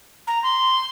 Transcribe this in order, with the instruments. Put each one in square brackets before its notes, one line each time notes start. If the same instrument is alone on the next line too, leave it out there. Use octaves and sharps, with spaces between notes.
[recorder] A#5
C6